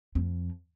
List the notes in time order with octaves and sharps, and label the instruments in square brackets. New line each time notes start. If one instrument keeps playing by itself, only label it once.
[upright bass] F2